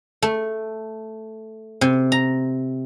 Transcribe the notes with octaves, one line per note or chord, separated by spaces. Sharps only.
A3
C3
A#5